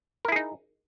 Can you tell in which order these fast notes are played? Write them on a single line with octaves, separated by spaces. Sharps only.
A#4 E4 G#4 D#4